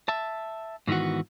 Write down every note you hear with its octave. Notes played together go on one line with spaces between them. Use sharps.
E5 A5
G#2 D#3 E3 B3 F#4